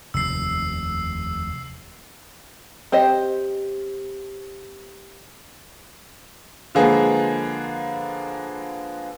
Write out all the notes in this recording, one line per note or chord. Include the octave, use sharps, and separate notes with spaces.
F1 D#2 E6 C7
C4 G4 C5 D#5
D3 F3 G#3 A#3 G#4 B4